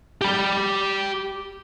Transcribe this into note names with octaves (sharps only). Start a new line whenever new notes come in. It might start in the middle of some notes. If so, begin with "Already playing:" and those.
G4 B5